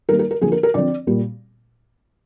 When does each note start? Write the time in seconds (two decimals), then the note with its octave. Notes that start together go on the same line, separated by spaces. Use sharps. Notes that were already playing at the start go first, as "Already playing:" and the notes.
0.09 D#3 G3 A#3 A#4
0.19 A#4
0.31 A#4
0.41 D3 F3 A#3 G#4
0.52 A#4
0.63 A#4
0.74 D3 F3 C4 D5
1.07 A#2 G3 A#3